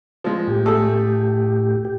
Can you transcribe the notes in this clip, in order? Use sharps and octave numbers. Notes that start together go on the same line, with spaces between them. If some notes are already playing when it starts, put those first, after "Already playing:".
F3 G#3
A2 G4
A3 G#4 A4
G4